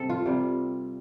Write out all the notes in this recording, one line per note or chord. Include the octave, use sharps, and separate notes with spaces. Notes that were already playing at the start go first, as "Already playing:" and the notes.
Already playing: C3 G3 A4
F4
C3 G3